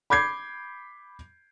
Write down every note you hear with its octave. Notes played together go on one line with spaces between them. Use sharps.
B5 D6 G6 G#6 C7